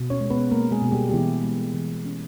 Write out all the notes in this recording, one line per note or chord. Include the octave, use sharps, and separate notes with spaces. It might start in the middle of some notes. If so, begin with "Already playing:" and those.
Already playing: B2
C#4 C#5
G#3
B3 B4
G#3 A#3 A#4
G#3 G#4
B2
G3 G4
G4
E3 B3 E4
G#3
E3
C#4